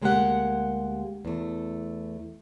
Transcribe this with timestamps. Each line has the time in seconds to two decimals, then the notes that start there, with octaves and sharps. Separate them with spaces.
0.02 D2 G#3 A#3 F4 G4 F#5
1.25 E2 A3